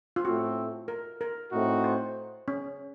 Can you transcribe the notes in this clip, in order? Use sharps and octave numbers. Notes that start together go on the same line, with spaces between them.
F4
A2 A3 C4 F#4
A#4
A#4
A2 A3 C4 D#4 F#4
C5
C#4